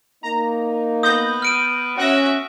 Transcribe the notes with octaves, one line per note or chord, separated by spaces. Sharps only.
A#3 D#4 A#5
B3 D#6 G6 A#6
F6 D7 D#7
C#4 F#4 E5 F#5 F#6 A#6